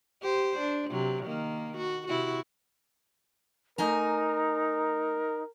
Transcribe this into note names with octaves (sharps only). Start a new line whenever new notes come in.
G4 C5
D4
C3 F#3
D#3 A#3
F#4
C3 E4 F#4
A3 D#4 A#4 G#5 A#5